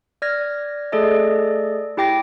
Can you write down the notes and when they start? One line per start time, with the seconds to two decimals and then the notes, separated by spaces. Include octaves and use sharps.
0.22 D5 F6 G#6 A#6
0.92 A3 G#4 A4 D5 D#5
1.97 E4 G4 G5 D6 A#6